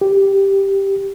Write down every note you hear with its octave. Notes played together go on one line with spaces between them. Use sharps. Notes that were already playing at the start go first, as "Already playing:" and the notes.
G4